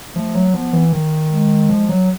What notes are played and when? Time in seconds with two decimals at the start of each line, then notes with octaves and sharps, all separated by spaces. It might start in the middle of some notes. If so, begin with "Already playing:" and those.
0.15 F3 A3
0.35 F#3
0.54 F3 B3
0.73 E3
0.93 D#3
1.31 G#3
1.69 F3
1.89 F#3